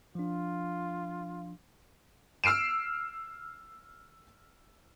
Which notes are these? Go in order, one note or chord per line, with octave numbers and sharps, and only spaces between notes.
F3 D4 F4
E6 F6 C7 D7 E7